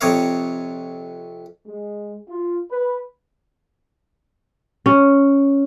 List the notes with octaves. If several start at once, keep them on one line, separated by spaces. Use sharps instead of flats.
F2 C3 C4 C#5 D#5 F5
G#3
F4
B4
C#4